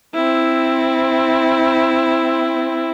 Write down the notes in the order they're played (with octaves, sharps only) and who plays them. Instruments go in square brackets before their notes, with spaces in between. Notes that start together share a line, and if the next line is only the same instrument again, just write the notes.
[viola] C4 E4